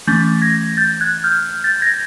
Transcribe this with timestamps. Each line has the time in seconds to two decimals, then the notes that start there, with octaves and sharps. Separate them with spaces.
0.07 E3 A3 C#4 G6 A6
0.42 G#6 A#6
0.77 G6 A6
1.01 F#6 G#6
1.24 F6 G6
1.64 G6 A6
1.82 G#6 A#6